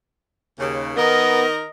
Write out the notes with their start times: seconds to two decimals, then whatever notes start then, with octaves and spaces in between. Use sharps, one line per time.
0.59 D#2 C#3
0.97 D#3 B3 A#4 D#5